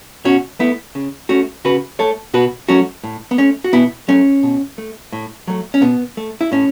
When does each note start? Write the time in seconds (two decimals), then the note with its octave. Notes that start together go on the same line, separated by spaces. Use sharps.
0.25 B2 C#4 F#4
0.59 A3 B3 E4
0.95 C#3
1.29 A3 C#4 F#4
1.65 C#3 F#4 B4
1.99 A3 A4 C#5
2.34 B2 F#4 B4
2.68 F#3 A3 C#4 F#4
3.04 A2
3.31 B3
3.38 A3 C#4
3.64 F#4
3.73 B2 B3 E4
4.08 F#3 A3 C#4
4.43 B2
4.78 A3
5.13 A2
5.47 F#3 A3
5.74 C#4
5.82 B2 B3
6.17 A3
6.41 E4
6.52 A2 C#4